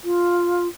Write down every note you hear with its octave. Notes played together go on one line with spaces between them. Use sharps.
F4